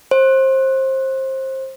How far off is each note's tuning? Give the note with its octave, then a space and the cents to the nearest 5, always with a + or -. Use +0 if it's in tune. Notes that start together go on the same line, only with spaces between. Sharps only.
C5 +25